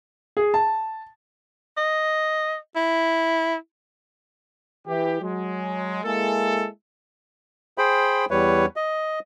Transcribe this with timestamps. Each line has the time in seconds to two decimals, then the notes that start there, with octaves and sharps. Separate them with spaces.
0.37 G#4
0.54 A5
1.77 D#5
2.76 E4
4.87 E3 G4
5.22 F#3 G#3
6.05 G#3 A#3 E4 G#4 A4
7.78 G#4 C5 G5 B5
8.31 E2 G3 B4 C#5
8.76 D#5